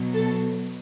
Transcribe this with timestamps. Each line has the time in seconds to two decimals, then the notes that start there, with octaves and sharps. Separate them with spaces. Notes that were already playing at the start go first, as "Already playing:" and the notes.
Already playing: B2 F#3
0.14 A4